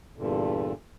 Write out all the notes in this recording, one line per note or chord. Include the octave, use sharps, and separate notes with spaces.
E2 G2 A#2 D3